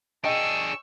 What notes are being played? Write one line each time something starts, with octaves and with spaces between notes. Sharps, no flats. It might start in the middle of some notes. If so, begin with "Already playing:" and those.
D4 G#4 D#5 G5 C#6 E6